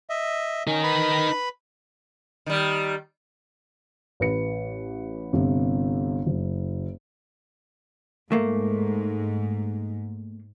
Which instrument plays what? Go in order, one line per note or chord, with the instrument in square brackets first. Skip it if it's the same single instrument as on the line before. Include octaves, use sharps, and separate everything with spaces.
[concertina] D#5 E5
[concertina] C#4 [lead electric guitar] D#4 A#4
[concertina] B4 B5
[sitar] D#3 G3
[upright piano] A1 B4 C#7
G1 C3
F#1
[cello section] G#2 [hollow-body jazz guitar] A3 A#3